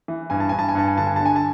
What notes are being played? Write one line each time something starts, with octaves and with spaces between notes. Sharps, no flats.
E3
G2 G#5
A5
G2 G#5
A5
G#5
G2 A5
G#5
D3 A5
G#5
D3 A5
G#5
A5